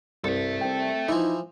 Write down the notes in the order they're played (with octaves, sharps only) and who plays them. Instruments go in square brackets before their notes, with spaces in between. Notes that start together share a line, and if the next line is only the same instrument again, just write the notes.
[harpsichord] C2 [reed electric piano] G2 [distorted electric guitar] A4 E5
[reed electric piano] C4 G5
[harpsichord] E3 F3 [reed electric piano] D#4 E4